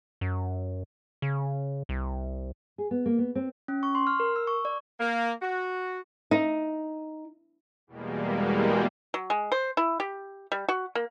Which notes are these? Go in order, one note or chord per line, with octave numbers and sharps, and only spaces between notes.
F#2
C#3
C2
G#4
B3
A#3
B3
C4
C#4
C#6
C6
F6
A#4
E6
C#6
D5
A#3
F#4
D#4
E2 B2 G3 G#3 A#3
F#3
G#3
C5
E4
G4
G3
F#4
A#3